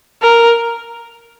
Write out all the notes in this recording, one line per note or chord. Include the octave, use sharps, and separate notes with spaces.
A#4